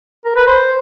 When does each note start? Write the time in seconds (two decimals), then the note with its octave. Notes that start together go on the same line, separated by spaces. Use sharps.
0.25 A#4
0.36 B4
0.47 C5